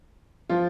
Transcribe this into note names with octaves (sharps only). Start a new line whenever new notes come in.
F3 F4